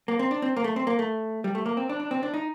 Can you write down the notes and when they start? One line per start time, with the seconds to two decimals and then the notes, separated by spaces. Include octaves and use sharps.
0.08 A#3
0.19 C4
0.31 D4
0.42 C4
0.57 A#3
0.64 A3
0.76 C4
0.87 A#3
0.99 A3
1.44 G3
1.55 A3
1.66 A#3
1.77 C4
1.89 D4
2.00 D4
2.11 C4
2.23 D4
2.34 D#4